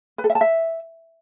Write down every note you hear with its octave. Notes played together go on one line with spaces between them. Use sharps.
B4
A4
E5
A5
E5